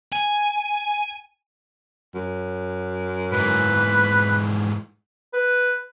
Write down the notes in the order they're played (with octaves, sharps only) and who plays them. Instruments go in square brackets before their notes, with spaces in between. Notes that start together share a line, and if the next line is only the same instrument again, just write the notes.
[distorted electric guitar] G#5
[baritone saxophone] F#2
[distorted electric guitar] G#2 E3 [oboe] B4
[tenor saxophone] B4